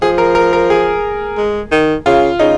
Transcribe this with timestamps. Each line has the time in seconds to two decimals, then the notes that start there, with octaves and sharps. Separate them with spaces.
0.02 F3 G#4
0.18 A#4
0.35 A#4
0.53 A#4
0.70 G#4
1.37 G#3
1.71 D#3
2.06 C#3 F4
2.39 C#3 D#4